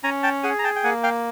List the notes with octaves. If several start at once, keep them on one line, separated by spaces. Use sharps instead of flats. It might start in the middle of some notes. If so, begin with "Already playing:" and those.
C#4 G#5 A#5
G5 A5
G#4 F#5 G#5
A#5
G5 A5
G5
A#3 F#5 G#5
F5 G5